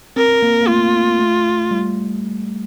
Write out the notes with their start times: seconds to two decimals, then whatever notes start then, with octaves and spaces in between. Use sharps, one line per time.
0.16 C4 A#4
0.42 A#3
0.62 A#3
0.68 A3 F4
1.19 A3
1.71 G3